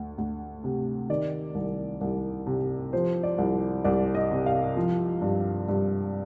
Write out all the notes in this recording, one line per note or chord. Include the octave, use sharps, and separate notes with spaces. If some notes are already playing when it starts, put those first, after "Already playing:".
Already playing: D2
D2
C3
D#3 D5
C2
C2
C3
F3 C5
D5
C2
C2 D5
D#5
C3
F5
F3
G2
G2